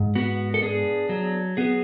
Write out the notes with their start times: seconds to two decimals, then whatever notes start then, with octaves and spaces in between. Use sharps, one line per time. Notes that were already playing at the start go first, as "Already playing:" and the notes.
Already playing: G#2
0.15 B3 F#4
0.54 A4
0.62 D4 G#4
1.09 F#3
1.57 B3 G#4